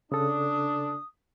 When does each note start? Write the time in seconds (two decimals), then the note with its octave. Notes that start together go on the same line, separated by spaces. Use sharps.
0.12 C#3 D4 A4 D#6